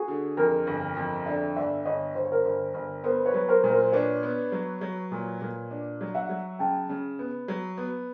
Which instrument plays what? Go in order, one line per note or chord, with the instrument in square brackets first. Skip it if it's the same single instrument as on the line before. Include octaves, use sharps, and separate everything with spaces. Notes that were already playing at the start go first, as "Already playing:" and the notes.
Already playing: [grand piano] F#4 G#4
[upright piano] D3
[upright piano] F2 [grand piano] G#4 A#4
[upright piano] G1
F2
[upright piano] D3 [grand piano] D5 E5
[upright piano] G1 [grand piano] D5 E5
[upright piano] G1 [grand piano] C#5 D#5
[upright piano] G1 [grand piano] C5
[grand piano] C#5
A#4 C5
[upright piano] G1
G1
[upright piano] B3 [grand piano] A#4 C5
[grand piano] B4 C#5
[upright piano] F#3
[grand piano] A#4 C5
[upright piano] A#2
[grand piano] A#4 C5
[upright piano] D4 [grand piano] B4 C#5
[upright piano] B3
F#3
F#3
A#2
A#2
D4
F#3
[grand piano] E5 F#5
[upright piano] F#3
[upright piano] C#3 [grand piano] G5 A5
[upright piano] C#3
B3
F#3
B3